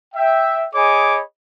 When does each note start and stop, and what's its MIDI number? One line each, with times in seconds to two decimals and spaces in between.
0.15 0.65 76
0.15 0.65 79
0.74 1.21 68
0.74 1.21 73
0.74 1.21 75
0.74 1.21 80
0.74 1.21 83
0.74 1.21 86